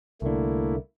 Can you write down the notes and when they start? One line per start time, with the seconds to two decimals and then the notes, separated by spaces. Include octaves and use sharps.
0.22 C2 D3 A3 A#3 E4